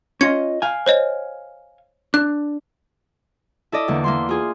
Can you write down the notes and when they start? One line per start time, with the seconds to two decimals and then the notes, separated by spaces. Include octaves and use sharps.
0.21 C#4 F4 D#5 G#6 C#7
0.62 F5 G#5
0.86 C5 C#5 D#5
2.14 D4 F#6
3.72 E4 A4 D5 D#5
3.88 E2 D3 A#3
4.04 A#3 E4 C6
4.29 F4 G#4